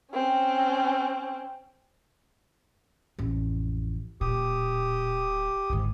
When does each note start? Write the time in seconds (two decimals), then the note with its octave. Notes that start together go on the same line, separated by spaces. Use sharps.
0.13 C4 C#4
3.18 A1 F2
4.21 D1 A#2 G4 D#6
5.70 G1 G#2 D#3